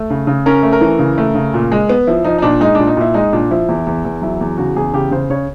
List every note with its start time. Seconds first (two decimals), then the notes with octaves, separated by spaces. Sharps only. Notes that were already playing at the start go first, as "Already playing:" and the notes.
Already playing: A3
0.10 C#3
0.27 C#3
0.46 C#4 A#4
0.63 A3
0.73 A#4
0.81 E3
0.99 C#3
1.18 A3
1.35 C#3
1.54 A#2
1.72 G#3
1.89 B3
2.07 F3 E4
2.25 F3 D#4
2.38 D#4
2.42 A#2 D4
2.60 G#3 D#4
2.75 A#2 D4
2.87 D#4
2.97 A#2 E4
3.14 G#3 D#4
3.33 A#2 D4
3.51 F3 E4
3.69 E2
3.87 E2
4.05 E2
4.22 F#3 E4
4.41 E2
4.58 C#3 F#4
4.76 E2 G#4
4.93 C#3 G4
5.11 C#3 C5
5.30 C#3 C#5